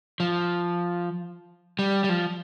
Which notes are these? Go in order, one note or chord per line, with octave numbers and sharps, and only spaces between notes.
F3
G3
G3
F3